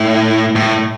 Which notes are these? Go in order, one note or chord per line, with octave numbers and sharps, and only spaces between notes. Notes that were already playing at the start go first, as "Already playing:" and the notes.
Already playing: A2
A2